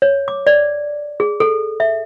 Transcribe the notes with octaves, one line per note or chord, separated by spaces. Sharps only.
C#5
D6
D5
G#4
A4
E5